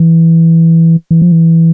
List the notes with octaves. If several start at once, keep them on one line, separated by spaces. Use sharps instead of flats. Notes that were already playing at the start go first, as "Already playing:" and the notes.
Already playing: E3
E3
F3
E3